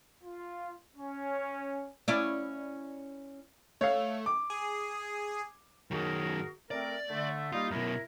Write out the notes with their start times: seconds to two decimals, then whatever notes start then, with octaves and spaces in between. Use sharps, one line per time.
0.23 F4
0.96 C#4
2.08 C#4 E4 D5
3.81 A3 C#5 F5
4.26 D6
4.50 G#4
5.91 F#2 D#3 F#4 G#4 A#4
6.71 A3 C4 A#4 D5
7.09 D3 A3
7.52 G3 A#3 D#4 F4
7.71 F#2 B2 E4 A#4